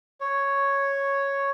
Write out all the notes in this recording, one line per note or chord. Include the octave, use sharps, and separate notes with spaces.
C#5